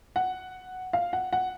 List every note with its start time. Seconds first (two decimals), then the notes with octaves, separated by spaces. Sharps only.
0.16 F#5
0.93 F5
1.13 F#5
1.33 F#5